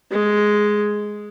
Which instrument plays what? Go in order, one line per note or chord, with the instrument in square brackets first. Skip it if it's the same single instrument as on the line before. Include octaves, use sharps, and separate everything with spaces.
[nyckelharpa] G#3